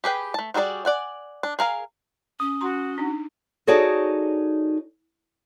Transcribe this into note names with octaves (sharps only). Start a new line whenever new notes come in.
G4 G#4 B4 G5
A3 A5
G3 F#4 G#4 A#4 D5
D5 F#5 G#5
D4
G#4 A#4 F5 G#5
C#4 D#6
F#4 A#5 C6
D4 D#4
D#4 F#4 G#4 A4 C#5 D5